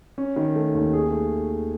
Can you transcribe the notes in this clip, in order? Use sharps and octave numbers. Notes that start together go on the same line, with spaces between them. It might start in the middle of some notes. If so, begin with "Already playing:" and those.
C#4
D#3
A3
D#2
G#4
A3